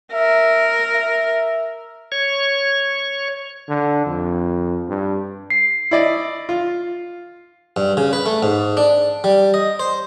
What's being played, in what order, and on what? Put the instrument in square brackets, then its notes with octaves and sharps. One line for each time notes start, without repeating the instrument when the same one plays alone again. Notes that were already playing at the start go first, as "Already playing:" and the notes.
[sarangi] A#4 [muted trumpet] E5
[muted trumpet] E5
[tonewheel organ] C#5 C#6
[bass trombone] D3
F2
G2
[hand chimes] C7
[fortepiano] E4 D5 D#5
F4
[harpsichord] G2
C#3
B4
A3
G#2
D4
G3
D#5
C5